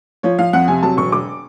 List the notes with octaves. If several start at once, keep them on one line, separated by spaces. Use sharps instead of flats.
F3 C#5
F3 F5
F2 F#5
C3 G#5
F#3 A5
E1 C#6
E1 D6